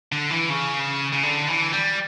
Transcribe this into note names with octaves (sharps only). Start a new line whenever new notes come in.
D3
E3
C#3
C#3
D3
E3
G3